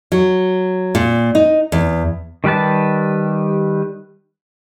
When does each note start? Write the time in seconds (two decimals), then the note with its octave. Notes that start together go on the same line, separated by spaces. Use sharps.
0.12 F#3
0.95 A#2
1.35 D#4
1.72 E2
2.44 D#3 G3 G4 B4 A5